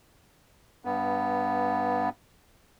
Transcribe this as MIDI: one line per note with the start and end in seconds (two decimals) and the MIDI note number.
0.85 2.09 43
0.85 2.09 59